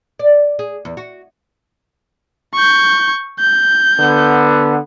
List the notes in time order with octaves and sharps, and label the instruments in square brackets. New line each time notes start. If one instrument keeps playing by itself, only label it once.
[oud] D5
G#4
E2
F#4
[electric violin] C#6 G6
G6
[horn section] D3 B3